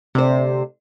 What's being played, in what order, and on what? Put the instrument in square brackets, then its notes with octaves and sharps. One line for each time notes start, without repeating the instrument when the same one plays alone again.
[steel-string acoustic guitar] D2 C5 [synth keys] C3